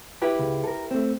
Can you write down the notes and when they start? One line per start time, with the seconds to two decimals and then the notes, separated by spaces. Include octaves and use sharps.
0.21 E4 G4 B4
0.39 C#2
0.64 A4 A#4
0.91 A3 C4